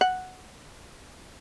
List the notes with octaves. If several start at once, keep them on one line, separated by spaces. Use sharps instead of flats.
F#5